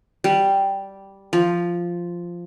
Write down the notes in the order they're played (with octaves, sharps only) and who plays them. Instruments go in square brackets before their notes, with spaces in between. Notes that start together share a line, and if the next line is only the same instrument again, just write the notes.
[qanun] G3
F3